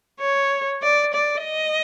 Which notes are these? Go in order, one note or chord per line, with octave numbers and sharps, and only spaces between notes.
C#5
D5
D5
D#5